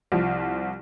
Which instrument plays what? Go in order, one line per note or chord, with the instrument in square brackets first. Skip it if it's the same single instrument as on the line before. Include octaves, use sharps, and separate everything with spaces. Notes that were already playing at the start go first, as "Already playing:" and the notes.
[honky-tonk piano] C2 F3